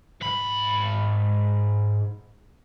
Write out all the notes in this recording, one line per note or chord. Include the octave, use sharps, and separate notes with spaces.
G#2 B5